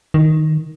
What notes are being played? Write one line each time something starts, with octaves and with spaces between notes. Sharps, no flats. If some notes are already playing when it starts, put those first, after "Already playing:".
D#3